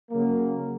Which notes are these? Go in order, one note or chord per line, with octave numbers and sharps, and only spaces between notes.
C#3 F#3 A#3